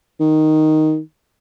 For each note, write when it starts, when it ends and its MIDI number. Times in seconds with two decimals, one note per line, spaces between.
0.20 0.99 51